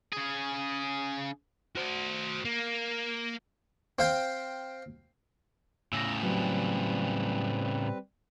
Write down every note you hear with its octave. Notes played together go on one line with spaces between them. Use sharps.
C#3 G#4
F#4 C5
A#3
C4 F5 G5
A2 C#3 E6 A#6
F#3 G3 C4 B4